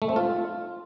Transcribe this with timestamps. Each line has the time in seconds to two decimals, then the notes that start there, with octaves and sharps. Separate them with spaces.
0.02 A3
0.09 C4
0.16 F4